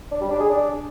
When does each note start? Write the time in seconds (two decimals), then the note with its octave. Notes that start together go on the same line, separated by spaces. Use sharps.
0.11 D4
0.21 G3
0.30 D4
0.40 G#4
0.50 D4